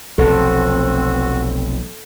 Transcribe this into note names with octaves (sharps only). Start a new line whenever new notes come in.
F1 B1 F2 C4 F#4 A4